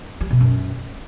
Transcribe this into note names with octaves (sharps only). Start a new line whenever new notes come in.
G3
B2
F#2